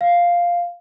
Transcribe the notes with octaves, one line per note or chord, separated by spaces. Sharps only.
F5